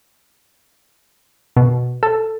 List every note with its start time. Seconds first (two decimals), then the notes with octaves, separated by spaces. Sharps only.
1.57 B2
2.03 A4